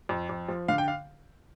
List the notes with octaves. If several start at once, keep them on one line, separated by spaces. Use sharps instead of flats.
F2
F2
F3
D3 F5
G5
F5